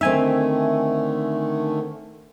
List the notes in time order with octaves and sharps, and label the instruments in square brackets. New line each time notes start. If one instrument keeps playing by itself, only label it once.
[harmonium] D3 D#3 A3 [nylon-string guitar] C4 D#4 [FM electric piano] E5 G#5